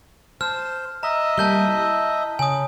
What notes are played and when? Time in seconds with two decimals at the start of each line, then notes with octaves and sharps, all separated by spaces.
0.41 C5 A5 F6
1.03 D#5 E5 A#5
1.38 G3 A#3 A5 G6 G7
1.68 E4
2.39 C#3 G#5 D#6